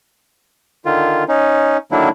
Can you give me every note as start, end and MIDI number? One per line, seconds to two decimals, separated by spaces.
0.85 1.24 50
0.85 1.24 51
0.85 1.24 65
1.28 1.77 61
1.28 1.77 63
1.92 2.09 50
1.92 2.09 51
1.92 2.09 54
1.92 2.09 58
1.92 2.09 62
1.92 2.09 64